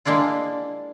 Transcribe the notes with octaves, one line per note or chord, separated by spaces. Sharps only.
G#3 A#3 D4 E4 F4